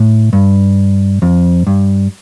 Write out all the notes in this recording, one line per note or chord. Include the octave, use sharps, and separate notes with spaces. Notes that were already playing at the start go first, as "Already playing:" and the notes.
Already playing: A2
G2
F2
G2